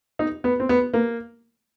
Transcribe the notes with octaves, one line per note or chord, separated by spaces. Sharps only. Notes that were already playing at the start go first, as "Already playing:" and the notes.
D#4
B3
C4
B3
A#3